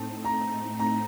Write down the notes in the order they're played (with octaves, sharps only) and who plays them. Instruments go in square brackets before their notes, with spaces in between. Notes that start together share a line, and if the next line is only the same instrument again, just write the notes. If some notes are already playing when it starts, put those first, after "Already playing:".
Already playing: [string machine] A2 A3 C4 D#4 [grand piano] A5
[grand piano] A#5
A#5